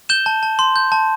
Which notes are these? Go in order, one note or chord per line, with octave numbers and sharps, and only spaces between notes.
G6 E7 G7
A5
A5
C6
G6
A5